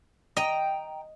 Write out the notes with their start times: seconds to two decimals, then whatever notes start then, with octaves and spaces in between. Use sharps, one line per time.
0.37 D#5 G5 A#5